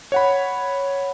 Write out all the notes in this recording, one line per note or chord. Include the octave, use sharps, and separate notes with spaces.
C#5 F#5 B5